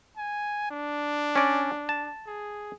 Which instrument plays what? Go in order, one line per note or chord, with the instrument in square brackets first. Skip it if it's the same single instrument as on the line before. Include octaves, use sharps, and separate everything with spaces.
[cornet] G#5
D4
[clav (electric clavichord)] C#4 D5
A5
[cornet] G#4